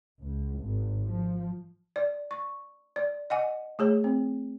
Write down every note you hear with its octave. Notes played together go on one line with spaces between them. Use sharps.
C#2
G#1
F3
D5
C#6
D5
D#5 F#5 G#5
A3 G#4 C#5
C4